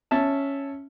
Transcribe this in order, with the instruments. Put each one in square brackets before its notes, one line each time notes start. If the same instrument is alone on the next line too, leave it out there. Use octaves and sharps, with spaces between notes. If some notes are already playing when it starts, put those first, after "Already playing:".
[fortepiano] C#4 E5 A5